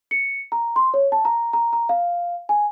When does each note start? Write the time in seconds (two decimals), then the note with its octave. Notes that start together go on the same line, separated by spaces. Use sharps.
0.11 C#7
0.52 A#5
0.76 C6
0.94 C#5
1.12 A5
1.25 A#5
1.53 A#5
1.73 A#5
1.89 F5
2.49 G#5